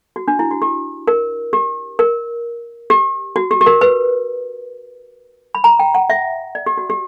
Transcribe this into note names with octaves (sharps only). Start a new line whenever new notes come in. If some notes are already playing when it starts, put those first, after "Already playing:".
F#4
D4
E4
F#4
G4
A#4
G4
A#4
G4
F#4
G4
G4
A#4
B4
B5
A#5
G5
F#5
E5
D5
G4
F#4
G4